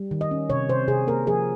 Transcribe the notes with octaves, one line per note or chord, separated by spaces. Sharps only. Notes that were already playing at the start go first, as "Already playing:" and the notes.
Already playing: G3
D#3
D#5
C#4
C3 C#5
C3 C5
C3 G#4
A#3 A#4
F3 G#4